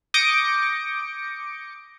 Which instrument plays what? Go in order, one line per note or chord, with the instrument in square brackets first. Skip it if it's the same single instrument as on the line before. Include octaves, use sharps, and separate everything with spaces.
[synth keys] D6 D#6 G6 A#6 C#7 D7